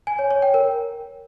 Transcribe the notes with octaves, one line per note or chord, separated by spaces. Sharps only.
G#5
C#5
C#5
G5
A#4